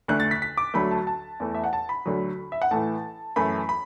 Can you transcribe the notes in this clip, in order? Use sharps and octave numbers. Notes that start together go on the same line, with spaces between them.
D2 D3 A3 F#6
A6
B6
B6
D6
D2 D3 F#3 A3 B5
A5
A5
E2 E3 A3
E5
F#5
A5
B5
D2 D3 F#3
E5
F#5
A2 E3 A3 A5
F#2 E3 A3 B5
B5